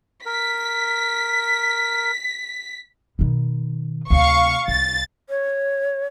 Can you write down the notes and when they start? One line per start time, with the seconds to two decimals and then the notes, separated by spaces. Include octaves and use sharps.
0.26 A#4 B6
3.19 B2 D#3
4.10 D2 C3 F5 C#6
4.68 C2 A6
5.29 C#5